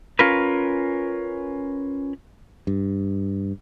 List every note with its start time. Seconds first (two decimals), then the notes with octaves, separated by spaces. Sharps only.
0.19 C#4 F4 A#4 B4
2.67 G2